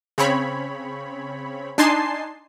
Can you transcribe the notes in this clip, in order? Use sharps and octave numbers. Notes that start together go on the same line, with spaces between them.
C#3 C4 C#5 B5
D4 D#4 G#5 A5 C6 C7